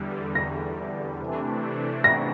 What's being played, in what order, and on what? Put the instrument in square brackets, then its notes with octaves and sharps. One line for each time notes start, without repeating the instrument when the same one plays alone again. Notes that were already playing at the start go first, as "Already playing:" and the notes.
Already playing: [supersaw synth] E2 D3 G3
[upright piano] A#6
[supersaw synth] C3 E3 A3 D4
[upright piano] A#6